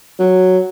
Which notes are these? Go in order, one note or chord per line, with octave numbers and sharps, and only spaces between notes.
F#3